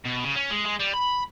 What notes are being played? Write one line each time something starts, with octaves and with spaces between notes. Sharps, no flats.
B2
C#3
C#4
G#3
G#3
G3
B5